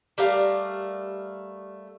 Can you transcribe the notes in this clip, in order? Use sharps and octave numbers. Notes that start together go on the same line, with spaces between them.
G3 A3 A#4 F5